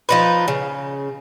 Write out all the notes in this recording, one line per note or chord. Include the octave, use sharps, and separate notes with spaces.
F3 D#4 B4
C#3